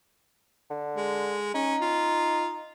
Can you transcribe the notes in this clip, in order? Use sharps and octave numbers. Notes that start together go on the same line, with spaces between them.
D3
G#3
C#4 D#4
F4